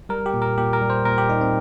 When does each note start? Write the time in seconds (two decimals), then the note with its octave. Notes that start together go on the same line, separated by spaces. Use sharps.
0.09 G3 A#4
0.26 G4
0.34 A#2
0.42 A#4
0.58 A#2 G4
0.73 A#4
0.82 G3
0.90 C5
1.05 A#2 A#4
1.18 G4
1.29 G3 D#4
1.41 C4